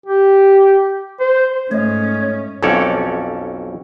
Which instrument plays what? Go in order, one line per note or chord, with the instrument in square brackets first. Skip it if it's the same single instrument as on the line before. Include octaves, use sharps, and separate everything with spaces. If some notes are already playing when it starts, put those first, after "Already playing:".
[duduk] G4
C5
[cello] G#2 C#4 [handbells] A3 D#5 [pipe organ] C#5
[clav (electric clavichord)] B1 F2 C#4 A4 C#5 D5